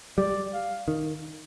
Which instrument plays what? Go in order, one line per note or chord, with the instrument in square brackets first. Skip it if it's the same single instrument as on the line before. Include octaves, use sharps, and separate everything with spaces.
[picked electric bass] G3 [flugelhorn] D5
[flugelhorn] F5
[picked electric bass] D#3